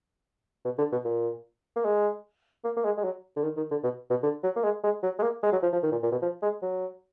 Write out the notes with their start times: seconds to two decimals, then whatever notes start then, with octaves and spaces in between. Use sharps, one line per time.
0.65 B2
0.78 D3
0.92 B2
1.05 A#2
1.76 A#3
1.84 G#3
2.64 A#3
2.77 A#3
2.84 G#3
2.97 G#3
3.04 F#3
3.36 D3
3.43 D#3
3.57 D#3
3.71 D3
3.83 B2
4.10 B2
4.23 D3
4.43 F#3
4.56 A#3
4.63 G#3
4.84 G#3
5.03 F#3
5.19 G#3
5.22 A#3
5.43 G#3
5.52 F#3
5.63 F3
5.73 F3
5.83 D#3
5.92 A#2
6.03 A#2
6.12 B2
6.22 F3
6.42 G#3
6.62 F#3